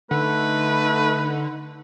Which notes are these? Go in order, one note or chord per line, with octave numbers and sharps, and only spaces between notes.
D3 A3 D#4 B4